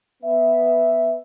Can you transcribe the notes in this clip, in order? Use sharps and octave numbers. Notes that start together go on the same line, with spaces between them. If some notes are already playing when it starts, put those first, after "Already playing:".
B3 E5